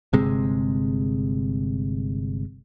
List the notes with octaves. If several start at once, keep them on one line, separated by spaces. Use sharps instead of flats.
G1 C3 G#3